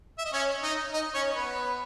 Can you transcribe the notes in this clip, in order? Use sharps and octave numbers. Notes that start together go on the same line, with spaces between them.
E5
D#5
C#4 C#5
D#4 D#5
D#4 D#5
C#4 C#5
B3 B4